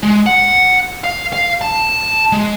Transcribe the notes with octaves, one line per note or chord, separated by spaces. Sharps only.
G#3
F#5
F5
F5
A5
G#3